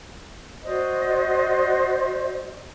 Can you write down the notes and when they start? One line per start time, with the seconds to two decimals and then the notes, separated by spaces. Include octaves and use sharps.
0.64 F#4 C5 D5 D#5